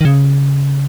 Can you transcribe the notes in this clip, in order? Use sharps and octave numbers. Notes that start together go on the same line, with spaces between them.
D#3
C#3